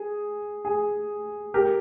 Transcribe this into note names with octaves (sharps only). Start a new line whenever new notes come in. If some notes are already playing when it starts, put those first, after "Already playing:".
Already playing: G#4
G#4
G4 A#4